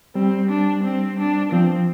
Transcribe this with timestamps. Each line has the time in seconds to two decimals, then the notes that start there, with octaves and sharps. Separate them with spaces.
0.15 G3 C4
0.50 D4
0.84 C4
1.18 D4
1.52 F3 C4